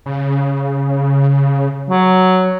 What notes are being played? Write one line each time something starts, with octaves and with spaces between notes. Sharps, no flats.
C#3
F#3